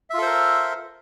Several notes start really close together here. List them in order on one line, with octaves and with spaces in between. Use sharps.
E5 F4 A4 C5 A#4